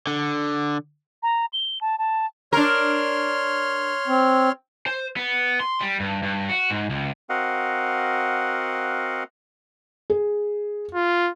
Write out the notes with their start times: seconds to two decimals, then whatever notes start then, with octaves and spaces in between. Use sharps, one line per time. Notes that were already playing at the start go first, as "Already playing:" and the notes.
0.07 D3
1.23 A#5
1.53 G7
1.81 A5
1.99 A5
2.53 D4 A#4 C#5 C6 F6
4.08 C4
4.86 C5
5.17 B3
5.60 C6
5.81 G3
6.00 G2
6.23 G2
6.49 F#4
6.70 G#2
6.90 C#2
7.30 C4 F#4 A#4 D#5 F5 F#5
10.10 G#4
10.95 F4